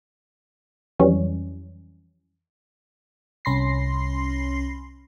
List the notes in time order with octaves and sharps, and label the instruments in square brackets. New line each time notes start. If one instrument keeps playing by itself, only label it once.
[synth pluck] F2 E3 F#3 G3 C#4
[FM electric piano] C2 C#4 B5 C6 A#6 C7